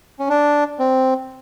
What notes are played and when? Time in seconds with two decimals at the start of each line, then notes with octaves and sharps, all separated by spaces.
0.19 C#4
0.29 D4
0.79 C4